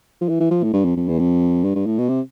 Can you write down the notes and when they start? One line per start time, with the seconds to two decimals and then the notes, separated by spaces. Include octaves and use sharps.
0.21 F3
0.29 E3
0.40 E3
0.51 F3
0.63 A2
0.74 G2
0.85 F2
0.96 F2
1.08 E2
1.19 F2
1.64 G2
1.75 G2
1.87 A2
1.98 B2
2.09 C3